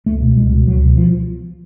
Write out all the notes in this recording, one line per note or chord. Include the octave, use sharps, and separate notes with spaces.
C#2 A3
B2
C#2 G#3
B2
C#2 F#3
B2
F3